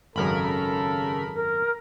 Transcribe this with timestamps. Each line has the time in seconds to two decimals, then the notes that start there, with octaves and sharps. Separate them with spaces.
0.16 G#1 F#2 C#3 A4 A#4 B5
1.34 A#4